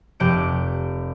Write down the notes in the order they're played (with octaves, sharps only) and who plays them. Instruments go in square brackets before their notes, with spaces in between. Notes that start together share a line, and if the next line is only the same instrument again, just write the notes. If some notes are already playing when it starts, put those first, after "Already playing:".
[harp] F1 G4 F#6 D7